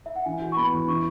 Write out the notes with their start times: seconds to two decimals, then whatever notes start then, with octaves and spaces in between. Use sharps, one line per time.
0.06 E5
0.16 F#5
0.25 E3 G#5
0.41 F#4
0.52 C#6
0.57 B3 B5
0.73 E2
0.88 E3 C#6